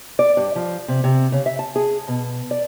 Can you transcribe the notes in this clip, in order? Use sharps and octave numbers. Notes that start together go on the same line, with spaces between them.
D5
G2
F3
C3
C3
C#3
E5
A5
G#4
B2
D5